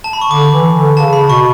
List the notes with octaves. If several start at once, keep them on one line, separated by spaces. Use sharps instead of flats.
A5
B5
C#6
D3 D6
E3
D3
C#3 A5
B5
B2 C#6